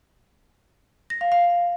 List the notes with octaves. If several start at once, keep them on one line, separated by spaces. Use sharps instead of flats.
A#6
F5
F5